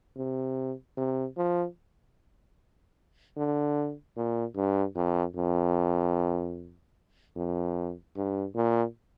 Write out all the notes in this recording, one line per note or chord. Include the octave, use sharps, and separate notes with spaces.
C3
C3
F3
D3
A#2
G2
F2
F2
F2
G2
A#2